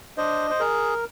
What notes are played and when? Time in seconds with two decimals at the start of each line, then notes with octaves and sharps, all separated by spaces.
0.17 D4 C5 D#5
0.51 C5
0.60 G#4 A#4